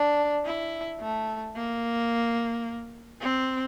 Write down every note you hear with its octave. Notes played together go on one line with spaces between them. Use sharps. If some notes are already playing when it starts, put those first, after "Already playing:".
Already playing: D4
E4
A3
A#3
C4